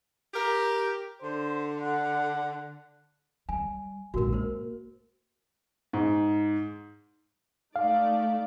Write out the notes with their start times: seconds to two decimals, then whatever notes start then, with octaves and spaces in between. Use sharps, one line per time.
0.33 G4 A#4
1.22 D3 C5
1.81 F#5
3.49 G3 G#5
4.14 A#1 G#2 F#4 A#4
4.33 A#3 A#4 C5
5.93 G#2
7.76 A3 D#4 D5 F5